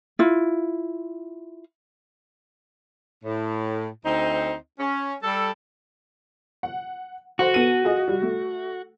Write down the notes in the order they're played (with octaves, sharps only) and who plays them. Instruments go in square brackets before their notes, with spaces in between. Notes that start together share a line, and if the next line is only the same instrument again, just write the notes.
[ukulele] E4 F4
[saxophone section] A2
D2 C4 D#4
C#4
G3 A4
[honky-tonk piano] F#5
[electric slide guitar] F#4 [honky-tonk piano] A4 C5 F#5
[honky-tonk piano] B3 A4 D#7
F4 G#4 D#5
G3
A3